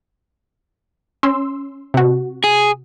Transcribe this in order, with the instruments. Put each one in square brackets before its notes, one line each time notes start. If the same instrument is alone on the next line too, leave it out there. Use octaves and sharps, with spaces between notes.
[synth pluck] C#4 C6 E6
C3 F#4
[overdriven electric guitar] G#4